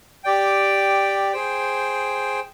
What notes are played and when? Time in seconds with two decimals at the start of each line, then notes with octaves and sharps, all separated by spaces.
0.24 G4 D5 G5
1.32 G#4 C5 G5